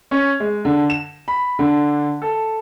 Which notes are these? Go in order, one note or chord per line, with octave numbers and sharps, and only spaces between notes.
C#4
G#3
D3
E7
B5
D3
A4